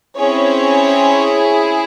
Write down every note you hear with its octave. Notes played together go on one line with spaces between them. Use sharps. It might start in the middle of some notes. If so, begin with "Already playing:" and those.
C4 C#4 E4 G#4 C#5